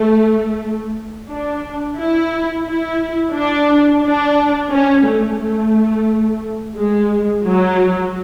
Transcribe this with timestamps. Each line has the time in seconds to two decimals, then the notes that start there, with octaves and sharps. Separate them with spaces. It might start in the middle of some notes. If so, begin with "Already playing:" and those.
Already playing: A3
1.30 D4
1.99 E4
2.67 E4
3.35 D4
4.03 D4
4.71 C#4
5.05 A3
5.39 A3
6.77 G#3
7.45 F#3